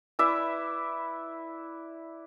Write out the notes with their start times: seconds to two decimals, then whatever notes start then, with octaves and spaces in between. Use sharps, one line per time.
0.19 E4 B4 D5 E5